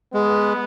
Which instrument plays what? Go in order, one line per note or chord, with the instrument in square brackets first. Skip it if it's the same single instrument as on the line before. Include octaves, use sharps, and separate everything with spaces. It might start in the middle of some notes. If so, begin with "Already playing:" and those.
[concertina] G#3 [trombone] B3